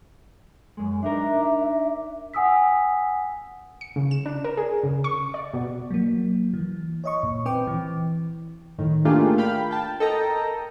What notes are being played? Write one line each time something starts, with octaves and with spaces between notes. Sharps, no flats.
F#2 G#3
D4 D#4 A#4 E5
F#5 G#5 D#6 E6 B6
C#7
C#3
E7
D4
A#4
G#4
C#3
C#6
D5
B2
F#3 A#3
E3
C#5 D#5 C#6
A#2
C4 B4 G5 D6
E3
A2 D#3
A3 A#3 D4 F4 G4 G#4
F5 G5 B5
G5 A5
A4 A#4 D#5 G5 A#5